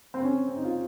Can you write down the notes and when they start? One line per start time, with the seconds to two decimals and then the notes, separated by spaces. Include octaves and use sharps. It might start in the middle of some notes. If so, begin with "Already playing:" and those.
0.14 C4
0.23 C#4
0.48 C4
0.56 D#4
0.64 F4